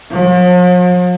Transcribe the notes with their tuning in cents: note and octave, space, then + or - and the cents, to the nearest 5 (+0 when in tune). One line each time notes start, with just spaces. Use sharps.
F3 +45